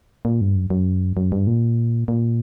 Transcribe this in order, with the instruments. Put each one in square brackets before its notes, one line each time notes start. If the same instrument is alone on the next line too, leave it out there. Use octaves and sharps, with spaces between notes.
[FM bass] A#2
G2
F#2
F#2
F#2
G2
A#2
A#2